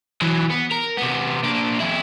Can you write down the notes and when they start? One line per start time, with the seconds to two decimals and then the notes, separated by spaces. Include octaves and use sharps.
0.21 E3 F#3
0.50 B3
0.71 A#4
0.97 C3 B3
1.43 A#2 D4
1.80 F2 E4